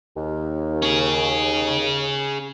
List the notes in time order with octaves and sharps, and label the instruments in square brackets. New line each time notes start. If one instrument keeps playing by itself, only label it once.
[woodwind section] D#2
[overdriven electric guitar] C#4 G#4